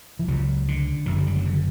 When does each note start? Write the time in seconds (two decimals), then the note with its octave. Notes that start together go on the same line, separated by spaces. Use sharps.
0.19 E3
0.28 C#2 C#3 F#3
0.68 D3
1.06 F#1 F#2 D3 E3
1.16 F#3
1.27 G3
1.36 F#3
1.46 D3